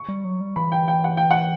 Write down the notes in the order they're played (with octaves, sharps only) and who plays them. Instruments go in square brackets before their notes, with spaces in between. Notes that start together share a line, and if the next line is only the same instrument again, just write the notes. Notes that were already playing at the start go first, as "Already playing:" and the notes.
Already playing: [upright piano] C#6
[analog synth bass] G3
F#3
G3
[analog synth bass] E3 [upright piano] B5
[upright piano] G5
G5
F#5
G5
F#5